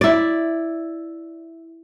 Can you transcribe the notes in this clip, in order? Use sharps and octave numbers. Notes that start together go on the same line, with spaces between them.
E4 D5